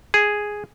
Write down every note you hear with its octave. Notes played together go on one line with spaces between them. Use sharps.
G#4